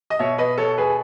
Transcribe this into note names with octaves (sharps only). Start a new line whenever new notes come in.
D#5
B2 C#5 E5
B4 D#5
A4 C#5
G#4 B4